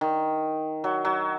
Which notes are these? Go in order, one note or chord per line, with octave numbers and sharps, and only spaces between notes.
D#3
F#3
F#3